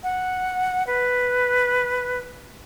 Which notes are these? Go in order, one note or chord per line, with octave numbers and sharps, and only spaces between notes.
F#5
B4